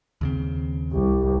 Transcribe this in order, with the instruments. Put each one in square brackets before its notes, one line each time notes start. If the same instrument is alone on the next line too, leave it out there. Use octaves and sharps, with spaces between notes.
[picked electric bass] D#2 C#3 C4
[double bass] C2 [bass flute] G4